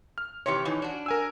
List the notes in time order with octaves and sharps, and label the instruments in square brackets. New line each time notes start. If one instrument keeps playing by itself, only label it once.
[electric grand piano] F6
[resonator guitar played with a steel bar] C3 E3 G4 [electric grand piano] C#5 C#7
[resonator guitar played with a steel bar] B2 E3 D#4
D4 F#4
[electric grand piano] A#4 G#5 E6